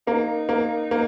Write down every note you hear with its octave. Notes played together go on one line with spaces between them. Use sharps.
A#3 D#4
A#3
A#3